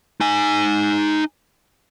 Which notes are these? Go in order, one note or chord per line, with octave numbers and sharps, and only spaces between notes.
D#4 G#5